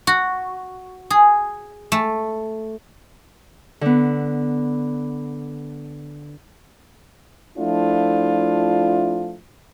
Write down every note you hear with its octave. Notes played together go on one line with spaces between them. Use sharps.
F#4
G#4
A3
D3 B3
F3 A3 D4 E4 F4